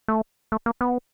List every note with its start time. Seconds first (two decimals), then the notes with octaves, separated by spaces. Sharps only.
0.08 A3
0.52 A3
0.66 A#3
0.81 B3